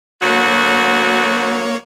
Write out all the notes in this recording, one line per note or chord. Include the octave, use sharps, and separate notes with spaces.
D2 F#3 A#3 F#4 C#5